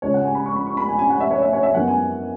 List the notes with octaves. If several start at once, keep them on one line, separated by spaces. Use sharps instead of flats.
C#2 C#3 G#3 C#4 C#5
F#5
G#5
B5
C#6
B5
C#6
B5
G#5
G#5
F#5
E5
C#5
E5
C#5
E5
F#2 E3 B3 F#5
G#5